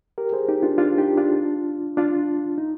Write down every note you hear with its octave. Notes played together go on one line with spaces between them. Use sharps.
G4 A#4
G#4 C5
D#4 G4
D4 F4
D4 F4
D#4 G4
D4 F4
D4 F4
D#4